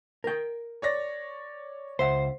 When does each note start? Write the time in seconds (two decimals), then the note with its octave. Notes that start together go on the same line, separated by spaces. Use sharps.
0.24 A#4 G5
0.82 C#5 D5 A#6
1.99 C#2 C5 E5 F#5